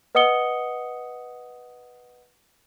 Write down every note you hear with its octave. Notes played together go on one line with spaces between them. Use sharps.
B4 D#5 F#5 D#6 C#7 G7